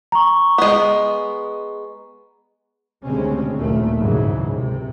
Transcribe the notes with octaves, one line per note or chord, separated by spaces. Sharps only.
A#5 C#6
G#3 B3
D2 C#3 G3 G#3 C4 C#4
F#1 D#2 A#2 A3
G#1 D2 G#2 C#3 E3 F#3
C#2 C3